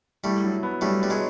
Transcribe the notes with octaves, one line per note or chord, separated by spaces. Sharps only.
G3 A3 E4
F#3
B3
F#3 G3 A3
G3 B3
F#3 G#3